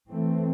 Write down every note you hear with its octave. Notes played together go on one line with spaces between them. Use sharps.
E3 A3 C4